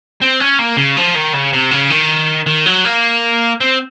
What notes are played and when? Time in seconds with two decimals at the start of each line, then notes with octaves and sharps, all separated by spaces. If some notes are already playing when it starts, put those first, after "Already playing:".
0.22 C4
0.40 C#4
0.59 A#3
0.77 C#3
0.97 F3
1.15 D#3
1.34 C#3
1.53 C3
1.71 C#3
1.90 D#3
2.47 D#3
2.66 F#3
2.85 A#3
3.60 C4